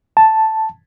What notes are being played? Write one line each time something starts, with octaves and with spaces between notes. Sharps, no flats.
A5